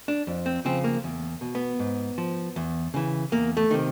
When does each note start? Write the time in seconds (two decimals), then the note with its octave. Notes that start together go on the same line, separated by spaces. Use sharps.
0.08 D4
0.27 F2
0.46 C4
0.65 C#3 F3 C4
0.84 A#3
1.04 E2
1.41 B2
1.55 B3
1.79 G#2
2.18 F3
2.56 E2
2.94 C#3 E3
3.32 E2 A#3
3.57 A3
3.71 C3 D#3